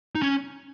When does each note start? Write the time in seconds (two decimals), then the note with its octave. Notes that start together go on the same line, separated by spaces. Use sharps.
0.15 D#4
0.22 C#4